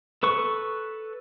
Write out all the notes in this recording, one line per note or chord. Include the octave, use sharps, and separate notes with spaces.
A4 B4 C#6